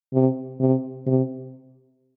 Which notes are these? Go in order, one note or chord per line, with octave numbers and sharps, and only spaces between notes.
C3
C3
C3